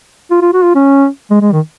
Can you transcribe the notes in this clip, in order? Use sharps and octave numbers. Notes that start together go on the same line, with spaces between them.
F4
F4
F#4
F4
C#4
G#3
G#3
D#3